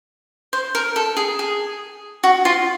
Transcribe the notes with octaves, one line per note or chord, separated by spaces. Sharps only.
C5
A#4
A4
G#4
G#4
F#4
F4